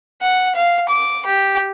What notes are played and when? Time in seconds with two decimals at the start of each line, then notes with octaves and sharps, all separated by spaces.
0.22 F#5
0.55 F5
0.89 D6
1.26 G4